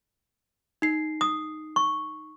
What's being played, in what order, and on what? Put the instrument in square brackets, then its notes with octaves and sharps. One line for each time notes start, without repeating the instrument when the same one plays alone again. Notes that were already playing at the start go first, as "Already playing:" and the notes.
[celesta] D#4 C7
[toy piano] D#6
C#6